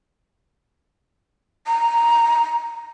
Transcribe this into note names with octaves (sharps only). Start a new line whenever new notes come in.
A#5